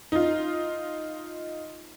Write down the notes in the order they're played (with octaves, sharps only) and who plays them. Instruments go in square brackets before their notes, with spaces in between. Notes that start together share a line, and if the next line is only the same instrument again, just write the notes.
[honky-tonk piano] D#4 F4